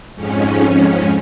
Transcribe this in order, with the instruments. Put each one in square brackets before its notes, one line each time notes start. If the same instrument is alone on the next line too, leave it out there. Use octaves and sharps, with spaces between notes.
[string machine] F2 G#2 C#4